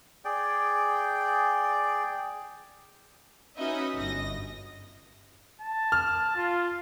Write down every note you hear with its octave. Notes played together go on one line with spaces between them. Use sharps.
G#4 D5 G5
C#4 D#4 F#4 B4 D#5 E5
G1 D#5 A#6
A5
F6
F4